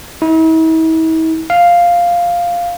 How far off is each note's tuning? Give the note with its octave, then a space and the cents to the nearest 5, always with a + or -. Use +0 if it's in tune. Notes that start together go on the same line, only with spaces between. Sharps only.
E4 -45
F5 +0